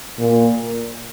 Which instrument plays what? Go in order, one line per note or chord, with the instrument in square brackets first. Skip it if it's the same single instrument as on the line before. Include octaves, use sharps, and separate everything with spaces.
[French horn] A#2